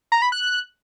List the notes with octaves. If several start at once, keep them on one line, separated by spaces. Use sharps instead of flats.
A#5
B5
F#6